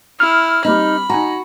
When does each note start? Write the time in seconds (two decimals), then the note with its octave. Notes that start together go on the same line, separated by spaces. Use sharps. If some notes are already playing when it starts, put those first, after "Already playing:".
0.20 E4 F6
0.65 G3 C4 D#4 B5
1.10 D#4 F#4 G#5 A#5